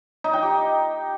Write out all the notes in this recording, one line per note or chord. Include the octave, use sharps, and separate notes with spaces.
D#4
G5
G4